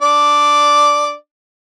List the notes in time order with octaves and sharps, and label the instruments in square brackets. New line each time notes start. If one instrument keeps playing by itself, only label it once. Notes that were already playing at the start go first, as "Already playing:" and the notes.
[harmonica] D4 D5